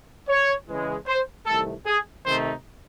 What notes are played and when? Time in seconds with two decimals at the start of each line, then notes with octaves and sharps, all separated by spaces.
0.29 C#5
0.68 C#3 E3 G#3
1.07 C5
1.47 C2 C3 D#3 A3 A4
1.86 G#4
2.25 C3 D#3 A3 D#4 C5